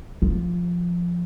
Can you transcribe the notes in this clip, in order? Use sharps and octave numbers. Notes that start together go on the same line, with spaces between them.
F3